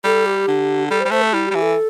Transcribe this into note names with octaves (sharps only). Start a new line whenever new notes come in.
G3 A4
G4
D3
G3 A4
C5
G3
A3 C5
A4
G3 E4
G3 G4
E3
A4